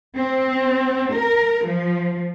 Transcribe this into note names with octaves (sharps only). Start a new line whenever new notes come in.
C4
A#4
F3